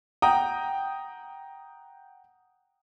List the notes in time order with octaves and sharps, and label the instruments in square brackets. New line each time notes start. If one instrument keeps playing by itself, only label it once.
[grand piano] F#5 G5 A#5 D#6